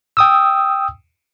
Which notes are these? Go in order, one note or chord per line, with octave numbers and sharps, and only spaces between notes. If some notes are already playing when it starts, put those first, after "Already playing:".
G5 D#6 E6